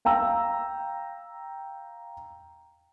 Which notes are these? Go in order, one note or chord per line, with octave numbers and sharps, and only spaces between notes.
F5 G5 A#5 E6